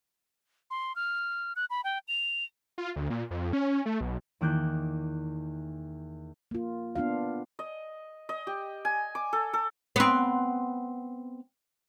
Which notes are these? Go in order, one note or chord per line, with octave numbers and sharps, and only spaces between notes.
C6
F6
F#6
B5
G5
F7
F4
D2
A#2
F2
C#4
A3
B1
E2 D#3 A#3 D6 F#6 G6
A#3 F4
B3 D4 F4 F5
D#5
D#5
G4
G#5
D6
A4
A4
B3 C4